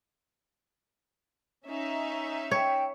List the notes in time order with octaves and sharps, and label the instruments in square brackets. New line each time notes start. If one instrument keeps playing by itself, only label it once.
[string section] C#4 D#4 E5
[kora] C#5 [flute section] G5